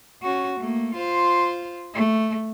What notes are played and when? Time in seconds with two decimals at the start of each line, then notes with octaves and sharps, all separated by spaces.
0.22 C#4 F#4
0.59 A3 A#3
0.94 F4 C5
1.94 A3